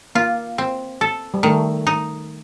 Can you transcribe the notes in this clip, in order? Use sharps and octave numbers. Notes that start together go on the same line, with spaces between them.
A#3 F4
C4
A4
G3
D#3 A3
D#4